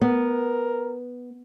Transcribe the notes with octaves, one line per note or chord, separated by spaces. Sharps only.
B3 A#4